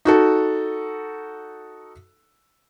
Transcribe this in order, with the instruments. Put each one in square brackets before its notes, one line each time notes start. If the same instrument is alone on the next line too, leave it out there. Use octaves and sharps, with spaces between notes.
[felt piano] D#4 F#4 A4